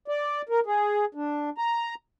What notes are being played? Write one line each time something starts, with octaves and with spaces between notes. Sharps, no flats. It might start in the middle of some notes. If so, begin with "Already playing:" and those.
D5
A#4
G#4
D4
A#5